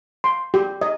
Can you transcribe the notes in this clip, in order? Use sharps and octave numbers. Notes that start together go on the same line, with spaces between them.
C6
G4
D#5